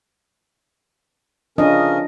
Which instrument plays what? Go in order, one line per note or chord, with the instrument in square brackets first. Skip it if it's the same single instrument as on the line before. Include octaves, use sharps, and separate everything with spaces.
[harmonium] C#3 C#4 A#4 [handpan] F3 D4 D#5